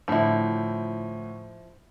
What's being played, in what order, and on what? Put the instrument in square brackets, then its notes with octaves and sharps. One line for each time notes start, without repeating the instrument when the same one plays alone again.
[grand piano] A2 D3 [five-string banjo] F3 E4